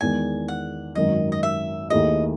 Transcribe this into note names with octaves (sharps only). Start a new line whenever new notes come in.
E2 D#3 G#3 G#5
F#5
G#1 F#2 D#3 F#3 D#5
D#5
E5
D#2 D#3 A3 E4 G#4 D#5